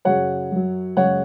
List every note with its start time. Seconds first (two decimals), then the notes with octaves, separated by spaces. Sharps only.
0.05 F#2 C#3 F#3 C#5 F#5
0.52 F#2 F#3
0.97 F#2 C#3 G#3 C#5 F#5